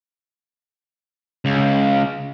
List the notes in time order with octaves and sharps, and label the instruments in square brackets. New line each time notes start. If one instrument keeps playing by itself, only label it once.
[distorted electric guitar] C#2